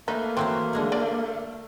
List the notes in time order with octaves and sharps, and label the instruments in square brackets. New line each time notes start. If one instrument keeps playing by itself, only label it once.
[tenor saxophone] A3 [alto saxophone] A#3 [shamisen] D#4 [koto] B4
[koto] E3 F#3 C5 [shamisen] C4
[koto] D3 G#3 G#4
[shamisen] D5